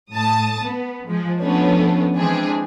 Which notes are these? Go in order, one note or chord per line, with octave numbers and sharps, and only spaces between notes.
A2 A5 D#6
B3
F3 G#3
F3 A3 B3 C#4 D4
E3 G#3 C4 D4 G#4